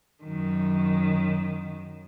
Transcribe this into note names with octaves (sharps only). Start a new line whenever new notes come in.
F#2 D#3